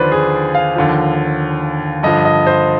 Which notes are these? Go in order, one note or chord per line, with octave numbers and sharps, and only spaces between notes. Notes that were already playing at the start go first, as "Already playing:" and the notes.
Already playing: D#2 D3 F3 B4 C5 D5
G#4
F5
D#2 D3 F3
G2 D3 F3 D#5
D#5
C5